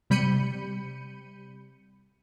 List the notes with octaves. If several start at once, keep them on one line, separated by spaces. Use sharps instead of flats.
C3 G3 B5 G6 C#7 D#7